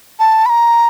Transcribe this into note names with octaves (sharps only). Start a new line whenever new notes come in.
A5
B5
A#5